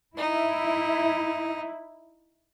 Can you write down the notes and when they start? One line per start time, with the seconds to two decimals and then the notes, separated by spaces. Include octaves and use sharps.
0.18 D#4 E4